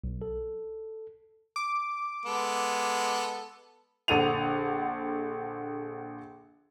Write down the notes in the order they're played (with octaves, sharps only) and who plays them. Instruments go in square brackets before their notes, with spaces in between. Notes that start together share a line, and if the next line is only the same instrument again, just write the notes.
[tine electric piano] B1
A4
[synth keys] D6
[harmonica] G#3 B3 A4
[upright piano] A#1 D3 A4 F#5 D#7 F7